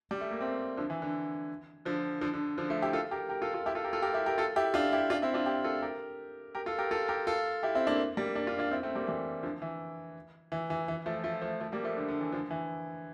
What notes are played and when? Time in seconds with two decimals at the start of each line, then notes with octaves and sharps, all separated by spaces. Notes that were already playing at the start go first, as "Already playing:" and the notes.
0.11 G3
0.21 A3
0.31 A#3
0.41 A3 C4
0.77 D3 F3
0.90 E3
1.02 D3
1.85 D3 F3
2.21 D3 F3
2.33 D3
2.58 D3 F3
2.70 F3 A3
2.82 E4 G4
2.93 F4 A4
3.11 G4 A#4
3.29 G4 A#4
3.42 F4 A4
3.54 F4 A4
3.66 E4 G4
3.75 F4 A4
3.84 G4 A#4
3.93 F4 A4
4.02 G4 A#4
4.14 E4 G4
4.26 G4 A#4
4.38 F4 A4
4.56 E4 G4
4.74 D4 F4
4.92 E4 G4
5.10 D4 F4
5.22 C4 E4
5.34 D4 F4
5.46 E4 G4
5.64 F4 A4
5.82 G4 A#4
6.55 G4 A#4
6.66 F4 A4
6.78 G4 A#4
6.91 F4 A4
7.08 G4 A#4
7.27 F4 A4
7.63 E4 G4
7.75 C4 E4
7.87 A#3 D4
8.17 G3 A#3
8.35 A#3 D4
8.47 D4 F4
8.59 D4 F4
8.71 C4 E4
8.83 A3 C4
8.95 G3 A#3
9.07 E3 G3
9.43 D3 F3
9.62 E3
10.52 E3
10.70 E3
10.88 E3
11.06 F3 A3
11.24 F3 A3
11.41 F3 A3
11.60 F3 A3
11.72 G3 A#3
11.84 F3 A3
11.97 D3
12.08 D3
12.21 E3
12.32 D3 F3
12.51 E3